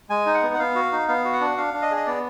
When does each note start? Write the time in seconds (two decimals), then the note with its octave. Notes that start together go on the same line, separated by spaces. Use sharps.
0.10 G#3 G#5
0.26 D#4
0.34 F#5
0.43 B3
0.54 F#5
0.59 B3 F5
0.75 F#4
0.92 D#4
1.08 B3 F5
1.25 F#4
1.33 F#5
1.41 D4
1.57 D4 F5
1.74 D4
1.82 D#5
1.91 G#4
1.96 D#5
2.07 B3 D5